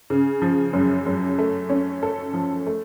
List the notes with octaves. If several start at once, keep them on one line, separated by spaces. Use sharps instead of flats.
C#3
F3
F#2
F#2
A3
C#4
A4
F3
A3